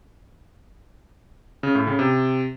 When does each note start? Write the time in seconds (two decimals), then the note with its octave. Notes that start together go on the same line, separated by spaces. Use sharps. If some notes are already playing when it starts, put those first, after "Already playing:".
1.63 C#3
1.75 A2
1.87 C#3
1.99 C3